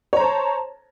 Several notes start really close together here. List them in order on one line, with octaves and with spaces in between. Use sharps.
C#5 A#5 C5 A5